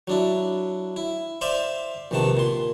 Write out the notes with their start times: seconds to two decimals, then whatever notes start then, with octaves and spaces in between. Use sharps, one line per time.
0.08 F#3 D4 E4
0.96 E4
1.41 C5 D5 E5 F5 C6
2.11 A#1 C3 D#3 B3 A5
2.37 A#2 C6